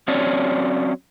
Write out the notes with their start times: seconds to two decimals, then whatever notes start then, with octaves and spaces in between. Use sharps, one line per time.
0.08 F#3 C4 C#4 C#5 D5